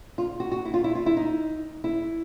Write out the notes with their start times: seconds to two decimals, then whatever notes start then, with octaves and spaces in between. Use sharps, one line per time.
0.18 F4
0.40 F#4
0.52 F#4
0.65 E4
0.74 F4
0.84 E4
0.95 F4
1.06 E4
1.17 D#4
1.84 E4